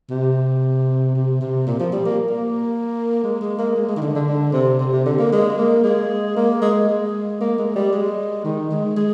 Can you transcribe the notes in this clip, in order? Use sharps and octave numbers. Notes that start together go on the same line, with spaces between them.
C3
C3
C3
A#2
F3
G3
A#3
A#3
G#3
G#3
A#3
G#3
G#3
D#3
D3
D3
D3
C3
C3
C3
D3
A#3
G#3
A#3
G#3
A#3
G#3
G#3
A#3
G#3
G3
G#3
D#3
G#3
G#3